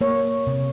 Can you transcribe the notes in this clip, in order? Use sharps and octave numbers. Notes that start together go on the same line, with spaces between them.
A#3 C#5
C3